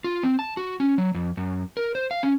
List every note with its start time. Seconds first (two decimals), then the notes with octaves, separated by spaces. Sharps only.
0.04 F4
0.23 C4
0.39 A5
0.57 F#4
0.80 C#4
0.98 F#3
1.14 F2
1.37 F#2
1.77 A#4
1.95 C5
2.11 F5
2.23 C#4